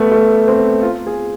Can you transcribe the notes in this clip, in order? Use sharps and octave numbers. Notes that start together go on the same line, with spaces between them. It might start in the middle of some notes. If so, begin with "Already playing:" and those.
Already playing: A3 B3
A3
C4
F4
G#4